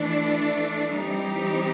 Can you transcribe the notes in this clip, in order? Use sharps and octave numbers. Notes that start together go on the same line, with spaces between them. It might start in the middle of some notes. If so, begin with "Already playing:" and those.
Already playing: E3 A3 D4
E3 G3 C4 D#4 G4